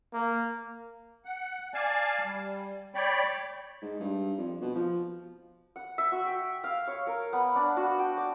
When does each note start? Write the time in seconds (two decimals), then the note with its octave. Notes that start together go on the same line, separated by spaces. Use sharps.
0.14 A#3
1.25 F#5
1.74 D5 F5 G#5 A5
2.24 G3
2.95 C#5 D5 G5 B5
3.82 G#2
4.00 G2
4.38 F2
4.61 B2
4.76 F3
5.76 F#5
5.98 E5
6.12 F#4
6.26 G5
6.64 F5
6.87 C#5
7.07 A#4
7.33 B3
7.56 D4
7.77 F#4
7.99 G5
8.17 D5